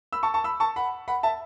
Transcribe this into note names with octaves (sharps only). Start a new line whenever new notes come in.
B5 E6
A5 C#6
A5 C#6
B5 E6
A5 C#6
F#5 B5
F#5 B5
E5 A5